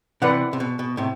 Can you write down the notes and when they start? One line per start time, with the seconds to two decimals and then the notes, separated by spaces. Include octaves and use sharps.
0.22 C3 E3 B4 D5 F#5
0.53 C3
0.60 B2
0.79 B2
0.97 A2 C3